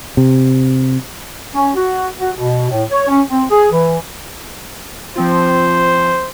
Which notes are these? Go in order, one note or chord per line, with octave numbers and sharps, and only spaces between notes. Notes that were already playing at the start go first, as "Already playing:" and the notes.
C3
C#4
F#4
F#4
B2
A2
C#5
C#4
C4
G#4
E3
F3 C4 F4 C5